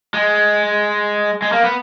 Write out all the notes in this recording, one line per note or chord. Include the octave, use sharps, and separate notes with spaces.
G#3
G#3
A#3
B3